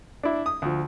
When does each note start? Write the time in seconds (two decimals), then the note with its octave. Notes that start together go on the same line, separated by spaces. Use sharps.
0.23 D4 E4
0.46 D#6
0.62 D2 F3